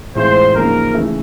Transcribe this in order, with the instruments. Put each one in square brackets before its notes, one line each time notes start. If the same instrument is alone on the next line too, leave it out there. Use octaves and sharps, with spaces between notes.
[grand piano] A2 E3 G#3 C4 F4 [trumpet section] C5
[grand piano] F#2 C#3 F3 A#3 D#4 [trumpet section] A#4
[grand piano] C#3 E3 A3